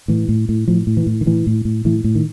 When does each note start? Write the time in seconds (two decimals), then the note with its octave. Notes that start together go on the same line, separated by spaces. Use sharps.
0.08 A2 E3
0.29 A2
0.49 A2
0.68 A2 F3
0.87 A2
0.97 E3
1.07 A2
1.21 D#3
1.26 A2 E3
1.47 A2
1.65 A2
1.85 A2 E3
2.04 A2
2.15 D#3